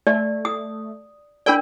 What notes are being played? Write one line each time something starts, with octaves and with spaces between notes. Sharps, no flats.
A3 D5
D#6
D4 A#4 D5 G5 B5